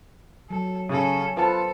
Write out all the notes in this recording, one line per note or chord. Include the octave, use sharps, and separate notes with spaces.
F#3 A4
C#3 C#4 A4
F4 A4 B4 C5 A5